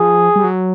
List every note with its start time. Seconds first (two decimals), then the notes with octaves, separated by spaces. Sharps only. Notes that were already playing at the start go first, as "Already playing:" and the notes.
Already playing: F3 G#4
0.36 G3
0.44 F#3